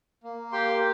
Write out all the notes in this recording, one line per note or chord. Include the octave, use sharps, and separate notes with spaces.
A#3
G4 G5 C6